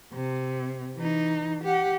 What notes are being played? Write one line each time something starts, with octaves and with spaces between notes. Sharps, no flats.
C3
E3 D#4
G4 F#5